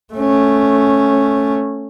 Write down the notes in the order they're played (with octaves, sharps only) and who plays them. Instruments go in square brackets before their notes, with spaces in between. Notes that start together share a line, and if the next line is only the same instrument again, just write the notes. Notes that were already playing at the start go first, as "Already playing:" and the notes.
[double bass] A3 C#4